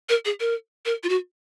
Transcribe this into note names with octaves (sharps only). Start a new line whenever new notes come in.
A#4
G#4
A#4
A#4
F4
F#4